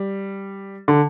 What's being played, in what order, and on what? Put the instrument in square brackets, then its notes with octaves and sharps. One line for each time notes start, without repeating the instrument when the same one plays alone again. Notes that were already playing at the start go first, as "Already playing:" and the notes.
Already playing: [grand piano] G3
D3